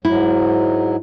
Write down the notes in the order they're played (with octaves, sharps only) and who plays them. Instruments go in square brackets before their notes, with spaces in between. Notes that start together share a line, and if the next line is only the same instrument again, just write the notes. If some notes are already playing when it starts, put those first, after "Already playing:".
[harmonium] G#2 F#3 [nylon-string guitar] E4